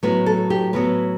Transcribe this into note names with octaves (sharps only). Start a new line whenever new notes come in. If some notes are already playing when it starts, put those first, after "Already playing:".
A2 F#3 B3 B4
A4
G4
A2 F#3 B3 B4